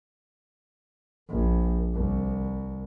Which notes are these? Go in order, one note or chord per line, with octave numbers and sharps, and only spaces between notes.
A#1
C2